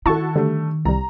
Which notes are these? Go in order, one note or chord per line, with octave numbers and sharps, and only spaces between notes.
D#3 E4 F#4 A4 A5 C#6
D3 G3 A3
C2 G3 A#5